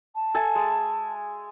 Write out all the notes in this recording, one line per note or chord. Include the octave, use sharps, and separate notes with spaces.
A5
A4 E5 G#5
G#3